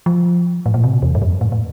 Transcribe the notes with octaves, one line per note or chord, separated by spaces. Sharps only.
F3
A2
A#2
C3
E2
G2
F2
A2
A2